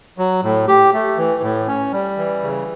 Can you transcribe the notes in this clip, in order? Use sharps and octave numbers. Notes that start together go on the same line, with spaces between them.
F#3
A2
G4
A3
E3
A2
C#4
G3
E3
C#3